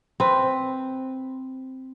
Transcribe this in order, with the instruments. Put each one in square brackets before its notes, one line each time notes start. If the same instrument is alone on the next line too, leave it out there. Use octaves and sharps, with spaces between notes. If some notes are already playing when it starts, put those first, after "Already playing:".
[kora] C4 B4